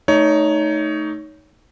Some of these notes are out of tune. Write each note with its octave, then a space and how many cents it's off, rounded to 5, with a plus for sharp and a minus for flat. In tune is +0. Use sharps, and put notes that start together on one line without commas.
A3 +0 D#4 +0 C#5 +20